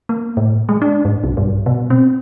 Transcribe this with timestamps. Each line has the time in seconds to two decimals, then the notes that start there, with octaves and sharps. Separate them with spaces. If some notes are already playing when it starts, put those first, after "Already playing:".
0.09 A#3
0.37 A2
0.69 G#3
0.82 D4
1.05 G#2
1.24 B1
1.37 G2
1.66 B2
1.90 C4